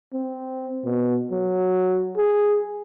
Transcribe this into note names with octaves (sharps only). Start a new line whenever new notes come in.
C4
B2
F#3
G#4